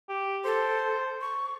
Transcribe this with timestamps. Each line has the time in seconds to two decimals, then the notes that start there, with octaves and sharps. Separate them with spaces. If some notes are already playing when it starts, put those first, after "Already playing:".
0.09 G4
0.45 A4 C5
1.21 C#6